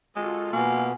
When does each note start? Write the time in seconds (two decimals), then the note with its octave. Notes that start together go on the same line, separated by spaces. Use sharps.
0.16 G#3 F4 F#4 A4
0.53 B2 A#3 G#5